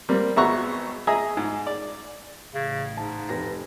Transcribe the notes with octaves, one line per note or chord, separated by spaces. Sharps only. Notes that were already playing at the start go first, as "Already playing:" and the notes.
G3 A#3 C4
G#1 B3 E5 F#5 A#5 C#6
G#4 D#5 E5 G#5 A#5
G#2
D5
A1 C#3
G#2 A5
F1 B4 A#6